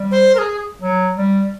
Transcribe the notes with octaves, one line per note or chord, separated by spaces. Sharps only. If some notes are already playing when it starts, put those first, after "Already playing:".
Already playing: G3
C5
A#4
G#4
F#3
G3